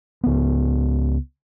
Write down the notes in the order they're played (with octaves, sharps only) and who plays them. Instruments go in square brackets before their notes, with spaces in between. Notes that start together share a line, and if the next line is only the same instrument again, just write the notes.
[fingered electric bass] C#2 B3